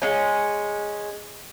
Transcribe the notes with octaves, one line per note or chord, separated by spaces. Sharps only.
G#3 C#4